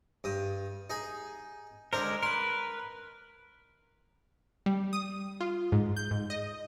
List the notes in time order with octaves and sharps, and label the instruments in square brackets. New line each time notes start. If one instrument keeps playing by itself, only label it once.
[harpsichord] G2 D#6
D#4 G#4
[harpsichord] D3 D4 C5 [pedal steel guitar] G#3 A#4
[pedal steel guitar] A#4 B4 [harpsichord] C6
[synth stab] G3
D#6
F4
G#2
G6
G#2
D#5